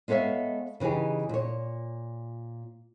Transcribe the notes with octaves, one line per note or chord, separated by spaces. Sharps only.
G#3 B3 A4 C#5 E5 F5
C#3 E3 D#4 G4 G#4
A#2 C#5